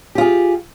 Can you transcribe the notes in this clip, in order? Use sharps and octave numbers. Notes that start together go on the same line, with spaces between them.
F4 G4 G#4